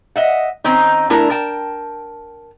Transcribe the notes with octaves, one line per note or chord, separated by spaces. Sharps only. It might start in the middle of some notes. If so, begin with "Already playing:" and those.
D#5 E5 F#5
D#3 C4 C#4 D#4
A3 D4 E4 A#4
A#4 G5 A5